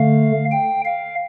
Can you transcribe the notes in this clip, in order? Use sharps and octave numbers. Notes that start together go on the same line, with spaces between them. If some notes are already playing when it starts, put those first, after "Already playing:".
Already playing: D3 A3 F5
G5
F5